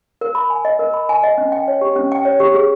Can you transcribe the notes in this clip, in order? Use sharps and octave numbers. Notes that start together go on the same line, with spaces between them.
A#4
B5
G#5
D#5
A#4
B5
G#5
D#5
C#4
G5
C#5
G4
C#4
G5
C#5
G4
G#4